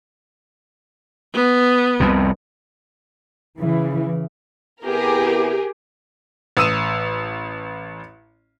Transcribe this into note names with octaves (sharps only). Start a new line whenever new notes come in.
B3
C2 F2 C3
C#3 E3
C3 B3 E4 G4 G#4 A#4
A1 D#6 E6 D#7 E7